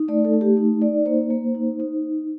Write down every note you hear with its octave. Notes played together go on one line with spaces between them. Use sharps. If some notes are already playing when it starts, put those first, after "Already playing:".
Already playing: D#4
A3 D5
A4
A3
G4
D#4
D#4 D5
A#3 C5
A#3
D#4
D#4